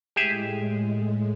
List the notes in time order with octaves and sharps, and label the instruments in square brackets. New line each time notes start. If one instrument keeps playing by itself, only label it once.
[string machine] A2 G#3 [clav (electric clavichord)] G4 G#4 E5